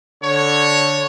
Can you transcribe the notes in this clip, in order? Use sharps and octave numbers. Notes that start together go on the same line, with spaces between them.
D3 C#5